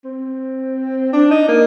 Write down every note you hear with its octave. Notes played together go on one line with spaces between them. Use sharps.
C4
D4
D#4
A#3